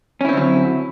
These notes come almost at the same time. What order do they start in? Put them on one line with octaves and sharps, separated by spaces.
C#4 E4 C4 D3 F#3